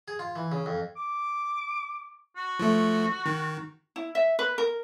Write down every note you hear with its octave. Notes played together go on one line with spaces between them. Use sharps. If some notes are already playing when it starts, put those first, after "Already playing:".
G#4
F4
E3
C#3
F2
D6
F#4
F3 A3
D#3
E4
E5
B4
A#4